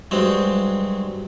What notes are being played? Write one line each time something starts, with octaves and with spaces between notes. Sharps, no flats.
G2 F#3 G#3 C4